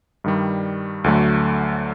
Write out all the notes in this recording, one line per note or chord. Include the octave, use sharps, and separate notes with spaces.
G2 D#3 G3
D2 D3 F#3 A3